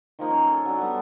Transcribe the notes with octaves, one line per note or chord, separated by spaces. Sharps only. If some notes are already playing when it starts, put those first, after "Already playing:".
D#3 F3 A#3 D#4
C#4
A4
F#3 D4
G3 B3 A5 A#5